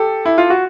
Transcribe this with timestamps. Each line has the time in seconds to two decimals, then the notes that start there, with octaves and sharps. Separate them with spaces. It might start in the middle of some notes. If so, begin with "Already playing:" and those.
Already playing: G4 A4
0.25 E4
0.38 F4
0.50 F#4